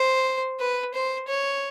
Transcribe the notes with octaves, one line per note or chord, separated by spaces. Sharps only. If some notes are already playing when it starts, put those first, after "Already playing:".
Already playing: C5
B4
C5
C#5